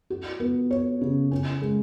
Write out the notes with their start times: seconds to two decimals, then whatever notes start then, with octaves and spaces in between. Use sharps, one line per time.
0.10 F#4
0.40 B3
0.71 C#5
1.01 C#3
1.31 C#4
1.62 G#3